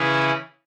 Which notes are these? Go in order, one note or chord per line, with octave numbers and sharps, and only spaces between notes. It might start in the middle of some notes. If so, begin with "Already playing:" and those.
Already playing: C#3 E3 C#4 E4 G#4